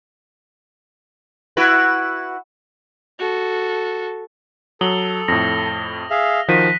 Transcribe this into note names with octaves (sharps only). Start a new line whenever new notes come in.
E4 F#4 B4
F#4 A4
F#3 A4 D#6 F#7 G7
F2 A2 A#6
G#4 E5 F5
D#3 F3 F#4 F#6 B6 D#7